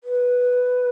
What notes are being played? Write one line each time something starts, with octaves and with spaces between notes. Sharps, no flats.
B4